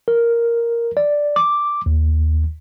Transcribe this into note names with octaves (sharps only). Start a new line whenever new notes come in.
A#4
D5
D6
D#2